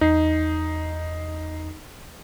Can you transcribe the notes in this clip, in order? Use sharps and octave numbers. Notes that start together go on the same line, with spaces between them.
E2 D#4 C7